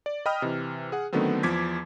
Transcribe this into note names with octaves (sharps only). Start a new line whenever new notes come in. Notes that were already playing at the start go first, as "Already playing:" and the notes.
D5
D#5 G5 B5 D#6 F6
C3 E3
G#4 F#5
D3 D#3 F#3 A3 B3 C4
E2 F3 D6 G#6 B6